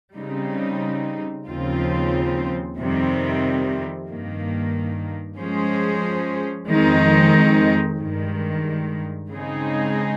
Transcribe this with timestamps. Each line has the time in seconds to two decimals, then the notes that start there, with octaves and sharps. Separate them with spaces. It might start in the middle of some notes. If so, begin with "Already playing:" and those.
0.17 C#3 G3 C4 D#4
1.48 D#2 C#3 F3 C4 F4
2.78 F2 C3 D#3 G3 C4
4.08 G2 D#3 A#3
5.39 F3 G#3 C#4 G#4 C5
6.69 F2 D#3 G#3 C4 D#4
7.99 G2 D#3 G#3
9.30 C#3 G#3 C4 D#4 G#4